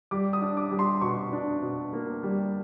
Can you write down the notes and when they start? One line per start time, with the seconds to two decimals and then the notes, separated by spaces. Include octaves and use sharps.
0.11 G3 D6
0.33 D#6
0.42 D4
0.57 D6
0.71 G3
0.79 C6
1.01 B2 C#6
1.33 D4
1.62 B2
1.93 A#3
2.23 G3